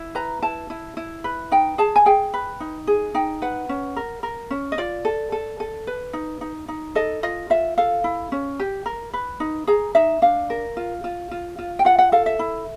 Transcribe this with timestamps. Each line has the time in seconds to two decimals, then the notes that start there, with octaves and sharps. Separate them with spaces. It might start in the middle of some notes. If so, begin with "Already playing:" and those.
Already playing: E4
0.15 B4 A#5
0.42 E4 A5
0.70 E4
0.97 E4
1.24 B4
1.51 D#4 G5
1.78 G#4 A5
1.96 G#5
2.06 G#4 G5
2.34 B4
2.60 D#4
2.87 G#4
3.15 D#4 G5
3.42 B4 F#5
3.69 C#4
3.96 A#4
4.23 A#4
4.51 C#4
4.72 D#5
4.78 F4 D5
5.05 A4
5.32 A4
5.60 A4
5.87 B4
6.13 D#4
6.41 D#4
6.68 D#4
6.95 A4 D#5
7.23 F4 D#5
7.50 F4 E5
7.78 A4 F5
8.04 E4
8.32 C#4
8.60 G4
8.86 A#4
9.13 B4
9.40 D#4
9.67 G#4 A#5
9.95 D#4 E5
10.22 D4 F5
10.50 A#4
10.77 F4
11.04 F4
11.31 F4
11.59 F4
11.79 G5
11.85 F4 F#5
11.99 F#5
12.12 A4 F5
12.26 E5
12.39 E4